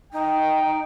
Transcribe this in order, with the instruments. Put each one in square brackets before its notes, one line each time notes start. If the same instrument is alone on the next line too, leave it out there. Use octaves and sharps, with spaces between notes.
[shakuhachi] D#4 [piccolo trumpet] G5